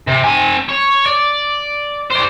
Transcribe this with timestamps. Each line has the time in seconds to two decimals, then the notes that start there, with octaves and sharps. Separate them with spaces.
0.07 C3
0.24 C4 G#5
0.69 C#5
1.06 D5
2.11 C5 D5